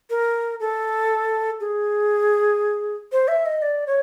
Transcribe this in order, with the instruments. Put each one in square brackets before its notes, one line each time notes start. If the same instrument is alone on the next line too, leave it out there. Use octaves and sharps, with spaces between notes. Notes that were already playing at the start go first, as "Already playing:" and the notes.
[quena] A#4
A4
G#4
C5
E5
D#5
D5
C#5